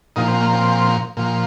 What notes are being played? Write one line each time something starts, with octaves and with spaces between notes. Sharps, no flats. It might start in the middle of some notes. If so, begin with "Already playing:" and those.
A#2 F3 D#4
C4
A#3
C4
A#2 F3